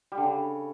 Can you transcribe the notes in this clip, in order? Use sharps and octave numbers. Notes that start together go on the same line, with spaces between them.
G3
D3
C#3